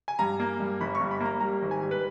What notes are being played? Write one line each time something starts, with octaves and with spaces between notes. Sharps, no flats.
G#5
G2 A#5
A#3
G2
G1 B5
C#6
G2
B5
A#3
A#5
G3 A#5
G#1
G#5
G3
B4